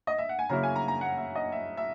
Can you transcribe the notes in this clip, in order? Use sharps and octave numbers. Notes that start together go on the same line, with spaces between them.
D#5
E5
F#5
G#5
C#3 F#3 A#3 C#4 E4 A#5
G#5
A#5
A#5
F#5
E5
D#5
E5
E5